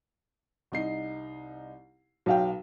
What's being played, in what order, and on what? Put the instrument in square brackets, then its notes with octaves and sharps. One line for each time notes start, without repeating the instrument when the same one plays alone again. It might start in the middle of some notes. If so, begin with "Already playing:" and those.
[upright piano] C2 D#4 C7
[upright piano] B1 [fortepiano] F#3 F5 G5